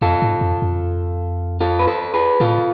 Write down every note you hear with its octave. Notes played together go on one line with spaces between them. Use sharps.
F2 F4 A4
G#2
F2
F2
F4 A4
B4
A4 C5
G#4 B4
A2 F4 A4